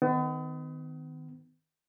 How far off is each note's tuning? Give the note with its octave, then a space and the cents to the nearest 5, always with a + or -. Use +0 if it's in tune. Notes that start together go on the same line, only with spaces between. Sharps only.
D#3 +0 B3 +40